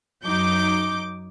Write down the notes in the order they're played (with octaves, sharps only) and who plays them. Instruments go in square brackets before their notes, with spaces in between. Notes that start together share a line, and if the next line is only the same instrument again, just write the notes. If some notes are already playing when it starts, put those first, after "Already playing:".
[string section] F#2 F#3 D#4 D6 G6